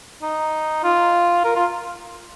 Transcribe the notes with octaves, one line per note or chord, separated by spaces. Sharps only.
D#4
F4
A#4
F4